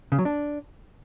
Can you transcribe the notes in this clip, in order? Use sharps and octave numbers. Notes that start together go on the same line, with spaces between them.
C#3
F#3
D4